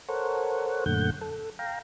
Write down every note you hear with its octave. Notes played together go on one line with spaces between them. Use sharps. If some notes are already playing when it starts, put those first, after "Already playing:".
A4 A#4 C5 C#5 F#5
F#2 A#2 D3 A3 F#5 G6
A4
F5 G5 A#5